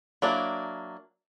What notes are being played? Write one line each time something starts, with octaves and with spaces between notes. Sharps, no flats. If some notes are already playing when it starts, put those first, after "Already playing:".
F#3 A#3 D4 E4